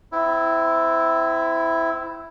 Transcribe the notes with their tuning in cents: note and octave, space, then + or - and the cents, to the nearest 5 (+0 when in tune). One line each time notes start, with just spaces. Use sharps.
C4 -30 E4 +0